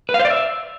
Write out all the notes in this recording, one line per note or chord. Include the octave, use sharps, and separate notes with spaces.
B4
F5
C5
D5
E5